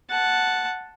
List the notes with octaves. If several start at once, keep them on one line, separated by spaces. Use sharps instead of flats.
F#5 A5